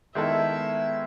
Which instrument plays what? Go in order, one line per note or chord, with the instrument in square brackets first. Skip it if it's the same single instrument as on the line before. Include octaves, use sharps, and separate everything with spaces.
[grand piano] D#3 G#3 B3 E4 A4 [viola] E5